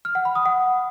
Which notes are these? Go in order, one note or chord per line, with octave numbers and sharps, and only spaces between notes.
F6
F#5
B5
D#6
F#5